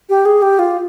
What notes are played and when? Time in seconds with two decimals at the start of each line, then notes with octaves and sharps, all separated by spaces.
0.09 G4
0.25 G#4
0.42 G4
0.59 F4